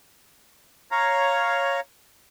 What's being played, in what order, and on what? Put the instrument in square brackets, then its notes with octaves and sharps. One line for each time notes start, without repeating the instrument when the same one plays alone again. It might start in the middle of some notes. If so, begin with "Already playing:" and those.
[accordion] C#5 F5 A#5